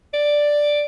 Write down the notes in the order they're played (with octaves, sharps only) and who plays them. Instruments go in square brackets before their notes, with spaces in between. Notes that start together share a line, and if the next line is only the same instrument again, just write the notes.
[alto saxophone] D5